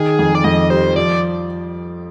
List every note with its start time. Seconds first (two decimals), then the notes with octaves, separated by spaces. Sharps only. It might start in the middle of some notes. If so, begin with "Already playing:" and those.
Already playing: D#3 G#4
0.19 F2
0.35 D5
0.44 F2 D#5
0.70 G3 C5
0.96 F3 D5